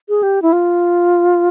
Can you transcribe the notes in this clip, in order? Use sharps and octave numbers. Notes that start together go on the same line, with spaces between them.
G#4
G4
E4
F4